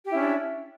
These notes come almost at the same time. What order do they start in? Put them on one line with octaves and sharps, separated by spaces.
G4 E4 C#4 D4